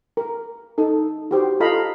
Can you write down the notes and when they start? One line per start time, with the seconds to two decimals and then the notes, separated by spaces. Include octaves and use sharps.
0.17 A#4
0.78 D#4 A4
1.31 F#4 G4 C5
1.60 F4 A4 D#5 F5 A#5 B5